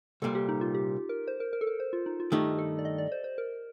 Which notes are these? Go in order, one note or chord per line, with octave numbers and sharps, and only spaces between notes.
C2 A#2 G3 A4
G4
D#4
F4
G4
A#4
C5
A#4
A#4
A4
A#4
C5
F4
D#4
F4
G2 D#3 A3 D#4 G4
A4
D5
D#5
D5
C5
C5
A#4